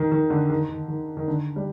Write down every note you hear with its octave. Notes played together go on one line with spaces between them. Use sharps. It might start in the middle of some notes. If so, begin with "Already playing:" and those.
Already playing: D#3
D#3
D3
D#3
D#3
D#3
D#3
D3
G3